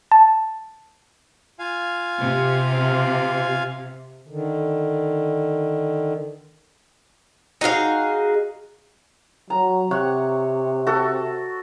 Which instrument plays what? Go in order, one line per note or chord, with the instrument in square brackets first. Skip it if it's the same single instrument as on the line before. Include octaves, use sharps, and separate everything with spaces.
[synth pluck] A5
[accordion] F4 F5 G#5
[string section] C3
[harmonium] D3 D#3
[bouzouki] D#4 F#4 G#4 F5
[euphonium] F#3 [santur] A#5
[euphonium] C3 [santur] C#5 F#5
[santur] F#4 A4